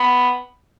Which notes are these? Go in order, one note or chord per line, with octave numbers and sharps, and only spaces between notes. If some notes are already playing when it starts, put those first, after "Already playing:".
Already playing: B3